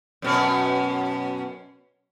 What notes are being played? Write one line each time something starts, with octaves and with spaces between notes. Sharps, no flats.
F#2 B2 C#4